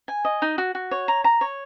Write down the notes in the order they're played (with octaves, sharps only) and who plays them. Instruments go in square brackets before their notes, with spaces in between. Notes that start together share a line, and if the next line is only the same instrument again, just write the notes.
[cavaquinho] G#5
D#5
D#4
F#4
F#4
C#5
A#5
A#5
C#5